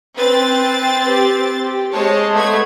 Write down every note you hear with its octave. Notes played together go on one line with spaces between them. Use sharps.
C4 B4 A6
G4
G4
G#3 C5 C#5 A5
A3 B3 G#6